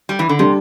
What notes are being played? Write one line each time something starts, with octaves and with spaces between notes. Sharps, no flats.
G3
E3
D3
C3 G3 D4 G4